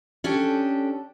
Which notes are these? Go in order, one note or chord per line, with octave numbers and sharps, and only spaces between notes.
C#4 D4 G4 A4